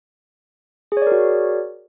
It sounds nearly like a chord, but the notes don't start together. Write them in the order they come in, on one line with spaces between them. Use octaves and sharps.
G#4 C#5 D5 A#4 F#4